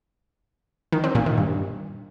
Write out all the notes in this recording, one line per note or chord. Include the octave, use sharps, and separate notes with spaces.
D#3
C4
A#2
D#3
G2